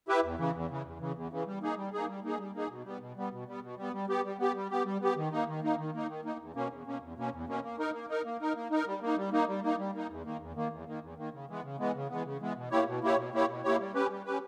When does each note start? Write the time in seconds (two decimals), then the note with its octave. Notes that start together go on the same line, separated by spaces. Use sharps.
0.08 E4 G4 B4 E5
0.23 E2
0.38 C#3 E3
0.54 E2
0.70 C#3 E3
0.85 E2
1.00 C#3 E3
1.16 E2
1.31 C#3 E3
1.46 G3
1.62 A#3 D#4 G#4
1.77 G3
1.93 A#3 D#4 G#4
2.08 G3
2.24 A#3 D#4 G#4
2.39 G3
2.54 A#3 D#4 G#4
2.70 B2
2.85 G3 B3
3.00 B2
3.16 G3 B3
3.32 B2
3.48 G3 B3
3.63 B2
3.78 G3 B3
3.93 G3
4.09 B3 G4
4.24 G3
4.40 B3 G4
4.55 G3
4.71 B3 G4
4.85 G3
5.01 B3 G4
5.16 D#3
5.32 A#3 D#4
5.48 D#3
5.63 A#3 D#4
5.78 D#3
5.94 A#3 D#4
6.09 D#3
6.25 A#3 D#4
6.40 E2
6.55 B2 A#3 C#4
6.71 E2
6.86 B2 A#3 C#4
7.01 E2
7.17 B2 A#3 C#4
7.33 E2
7.47 B2 A#3 C#4
7.64 A#3
7.79 D#4 A#4
7.94 A#3
8.09 D#4 A#4
8.25 A#3
8.41 D#4 A#4
8.55 A#3
8.70 D#4 A#4
8.87 G3
9.02 A#3 D#4
9.17 G3
9.32 A#3 D#4
9.48 G3
9.63 A#3 D#4
9.79 G3
9.95 A#3 D#4
10.10 E2
10.25 D#3 A#3
10.40 E2
10.55 D#3 A#3
10.72 E2
10.87 D#3 A#3
11.02 E2
11.17 D#3 A#3
11.33 C#3
11.49 E3 G#3 B3
11.64 C#3
11.79 E3 G#3 B3
11.95 C#3
12.10 E3 G#3 B3
12.25 C#3
12.40 E3 G#3 B3
12.57 B2
12.71 A#3 E4 G4 C#5
12.87 B2
13.03 A#3 E4 G4 C#5
13.17 B2
13.34 A#3 E4 G4 C#5
13.49 B2
13.64 A#3 E4 G4 C#5
13.80 G3
13.94 C#4 G4 B4
14.10 G3
14.26 C#4 G4 B4